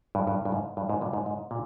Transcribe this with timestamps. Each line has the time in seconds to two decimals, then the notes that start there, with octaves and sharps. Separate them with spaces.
0.15 G2
0.27 G2
0.45 G2
0.52 G#2
0.77 G2
0.90 G#2
1.01 G2 A#2
1.13 G#2
1.26 G#2
1.51 A#2